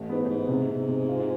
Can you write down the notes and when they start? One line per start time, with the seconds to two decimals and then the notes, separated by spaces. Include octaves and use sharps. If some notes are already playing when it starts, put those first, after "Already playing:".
Already playing: A1 A3
0.09 G#2 B3
0.23 A2
0.28 G#2 B3
0.49 C3
0.69 C3
0.88 C3
1.08 F4